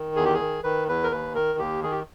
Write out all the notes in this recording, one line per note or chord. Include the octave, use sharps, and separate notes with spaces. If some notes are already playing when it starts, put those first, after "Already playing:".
Already playing: D#3
E2 G#4
G4
G#4
D#3
D#3 B4
E2 B4
A#4
D#2 B4
D#3 A#4
D#2 G4
D#3 G#4
G4